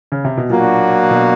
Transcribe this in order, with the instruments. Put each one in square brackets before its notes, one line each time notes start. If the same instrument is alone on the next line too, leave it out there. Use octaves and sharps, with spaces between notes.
[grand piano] C#3
C3
B2
[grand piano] A#2 [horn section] F#3 A#3 D4 F#4
[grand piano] B2